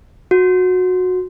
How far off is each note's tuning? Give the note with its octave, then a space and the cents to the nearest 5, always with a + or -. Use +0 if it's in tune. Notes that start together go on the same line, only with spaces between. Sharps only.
F#4 -15